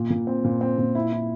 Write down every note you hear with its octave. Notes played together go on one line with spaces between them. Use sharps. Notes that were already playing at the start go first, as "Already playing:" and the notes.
Already playing: A#2
A#2
C4
A#2
C4
A#2
E4
E4